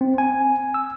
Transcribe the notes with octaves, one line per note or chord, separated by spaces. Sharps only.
C4
G#5
E6